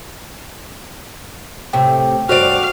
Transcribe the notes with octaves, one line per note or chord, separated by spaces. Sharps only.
A2 C3 G5
G2 F#4 C5 D5 F5